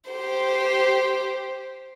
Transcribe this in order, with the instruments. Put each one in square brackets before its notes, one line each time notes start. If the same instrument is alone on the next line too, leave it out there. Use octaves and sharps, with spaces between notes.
[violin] G4 C5